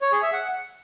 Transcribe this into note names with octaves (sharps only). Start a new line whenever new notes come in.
C#5
G#4
E5
F#5